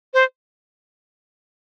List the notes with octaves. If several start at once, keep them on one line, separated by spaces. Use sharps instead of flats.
C5